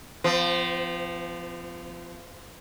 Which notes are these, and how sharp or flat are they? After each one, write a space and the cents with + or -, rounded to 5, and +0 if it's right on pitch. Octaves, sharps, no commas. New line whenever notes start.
F3 -15 C4 -45